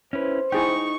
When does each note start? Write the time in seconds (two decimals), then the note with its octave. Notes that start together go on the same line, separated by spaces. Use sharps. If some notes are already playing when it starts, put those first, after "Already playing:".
0.13 C#4 E4 B4 C5
0.52 D#4 E4 G#4 G5 C#6